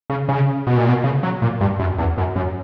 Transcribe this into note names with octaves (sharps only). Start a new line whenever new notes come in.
C#3
C#3
B2
A#2
B2
C#3
F#3
A#2
G2
F#2
E2
F#2
F#2